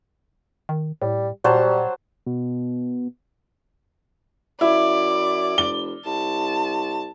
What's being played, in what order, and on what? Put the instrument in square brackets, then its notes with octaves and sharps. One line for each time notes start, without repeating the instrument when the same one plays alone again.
[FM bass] D#3
[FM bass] A2 [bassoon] G3
[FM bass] A#2 [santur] F#3 C5 A5 [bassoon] G3
[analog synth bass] B2
[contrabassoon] F#2 [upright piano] E4 [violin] D5
[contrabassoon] F1 [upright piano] G7
[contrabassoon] C2 [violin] A5